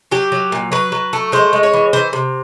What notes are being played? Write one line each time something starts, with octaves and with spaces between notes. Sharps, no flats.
F#3 G4
F#3
A#2
F#3 B4
F#3
A3
G#3 C5
G#3
C#5
E3
E3 C5
C3